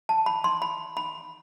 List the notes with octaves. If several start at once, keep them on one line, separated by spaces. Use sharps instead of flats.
A5
B5
C6
B5
B5